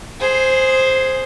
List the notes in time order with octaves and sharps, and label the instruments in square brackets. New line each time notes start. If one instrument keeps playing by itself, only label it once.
[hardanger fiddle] G#4 C5